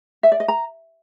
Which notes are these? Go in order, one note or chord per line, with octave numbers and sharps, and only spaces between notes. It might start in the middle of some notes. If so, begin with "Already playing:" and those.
E5
D5
D#5
A#5